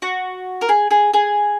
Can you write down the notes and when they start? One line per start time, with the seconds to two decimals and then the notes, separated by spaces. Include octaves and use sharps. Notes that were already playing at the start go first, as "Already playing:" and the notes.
0.02 F#4
0.61 A#4
0.69 G#4
0.91 G#4
1.14 G#4